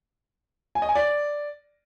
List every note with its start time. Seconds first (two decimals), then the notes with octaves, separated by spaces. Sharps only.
0.75 G#5
0.82 D#5
0.89 G#5
0.95 D5